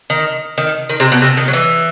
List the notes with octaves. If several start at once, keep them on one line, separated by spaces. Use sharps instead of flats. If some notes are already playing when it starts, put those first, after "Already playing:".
D#3
D#3
D#3
C3
B2
C3
D#3
F#3
E3